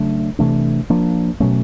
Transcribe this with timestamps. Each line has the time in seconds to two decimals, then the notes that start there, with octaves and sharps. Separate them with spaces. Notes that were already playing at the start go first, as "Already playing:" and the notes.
Already playing: C#3 F#3 A3 D4
0.39 C3 E3 A3 D4
0.90 F3 A#3 D4
1.40 B2 F#3 A3 C#4